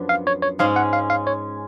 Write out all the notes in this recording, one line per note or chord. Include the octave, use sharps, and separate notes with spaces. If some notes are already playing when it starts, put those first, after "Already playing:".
Already playing: F#2 F3 B3 D4
F5
C#5
C#5
G#2 G#3 C#4 F5
F#5
F5
F5
C#5